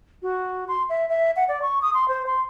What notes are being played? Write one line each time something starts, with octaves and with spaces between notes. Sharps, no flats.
F#4
C6
E5
E5
F#5
D5
C#6
D#6
C6
C5
C6